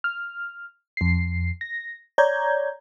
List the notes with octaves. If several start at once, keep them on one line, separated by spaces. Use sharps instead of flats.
F6
F2 C7
A#6
C#5 D5 A#5 G6 G#6